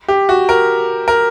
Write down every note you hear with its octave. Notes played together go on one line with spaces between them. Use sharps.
G4
F#4
A#4
A#4